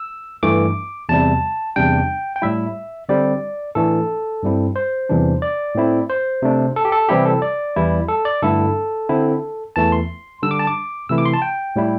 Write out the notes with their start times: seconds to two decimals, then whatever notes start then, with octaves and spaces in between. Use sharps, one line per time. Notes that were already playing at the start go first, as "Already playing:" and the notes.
Already playing: E6
0.43 G2 E3 A3 D6
1.09 E2 C3 G3 A5
1.76 E2 C3 G3 D4 G5
2.36 G5
2.42 A2 G3 E4 E5
3.09 D3 G3 C4 D5
3.75 A2 E3 A3 D4 A4
4.43 G2 G3 C4 E4
4.76 C5
5.09 E2 C3 E3 G3 D4
5.42 D5
5.75 A2 A3 C4 E4
6.10 C5
6.42 C3 A3 D4
6.76 A4
6.85 G4
6.92 A4
7.09 C3 E3 G3 C4 E4 G4
7.25 A4
7.42 D5
7.76 E2 E3 G3 E4
8.09 A4
8.25 D5
8.42 G2 D3 A3 E4 A4
9.09 D3 C4 E4
9.76 E2 E3 A3 A5
9.92 C6
10.43 D3 G3 D4 E6
10.51 D6
10.59 A5
10.67 D6
11.09 C3 E3 A3 E4 E6
11.18 D6
11.25 C6
11.33 A5
11.42 G5
11.76 A2 G3 E4